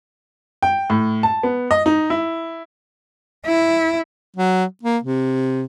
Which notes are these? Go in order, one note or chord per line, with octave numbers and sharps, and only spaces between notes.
G5
A2
A5
B3
D#5
D#4
E4
E4
F#3
A#3
C3